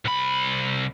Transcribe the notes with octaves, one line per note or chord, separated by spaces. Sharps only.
C2 B5